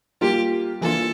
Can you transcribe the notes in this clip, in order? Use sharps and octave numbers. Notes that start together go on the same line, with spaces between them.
G3 A#3 F4 G4
E3 A#3 D4 F4 A4